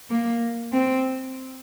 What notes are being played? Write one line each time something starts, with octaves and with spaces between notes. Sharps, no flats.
A#3
C4